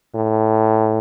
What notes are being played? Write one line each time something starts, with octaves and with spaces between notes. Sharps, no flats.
A2